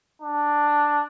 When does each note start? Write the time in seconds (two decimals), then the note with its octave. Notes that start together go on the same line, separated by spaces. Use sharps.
0.22 D4